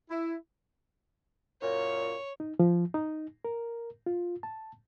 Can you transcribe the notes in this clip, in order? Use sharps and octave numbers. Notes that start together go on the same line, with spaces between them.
E4
F#2 A#2 C#5
D#4
F3
D#4
A#4
F4
A5